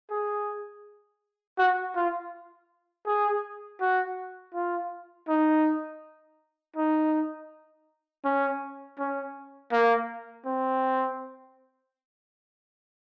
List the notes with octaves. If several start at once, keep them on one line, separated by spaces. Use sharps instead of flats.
G#4
F#4
F4
G#4
F#4
F4
D#4
D#4
C#4
C#4
A#3
C4